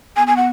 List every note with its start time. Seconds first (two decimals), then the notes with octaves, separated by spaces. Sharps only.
0.16 B3 G#5
0.27 B3 G#5
0.37 F#5